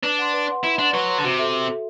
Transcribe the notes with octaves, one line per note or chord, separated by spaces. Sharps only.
D4 B4
F#5 C6
B4
F#5 C6
E4 B4
D4 F#5 C6
F#3 B4
F#5 C6
D3
C3 F#4
A4 E5
F#4
A4 E5